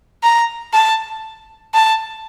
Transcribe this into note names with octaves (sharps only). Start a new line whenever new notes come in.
A#5
A5
A5